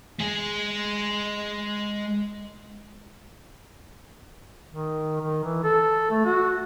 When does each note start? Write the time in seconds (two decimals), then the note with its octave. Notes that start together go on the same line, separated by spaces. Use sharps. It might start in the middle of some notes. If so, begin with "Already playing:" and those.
0.20 G#3 G#4
4.71 D#3
5.21 D#3
5.44 E3
5.64 A4
6.11 A3
6.25 F#4